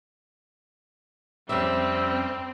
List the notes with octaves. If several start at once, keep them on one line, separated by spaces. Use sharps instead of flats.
F2 G3 C4 C#4 E5 E6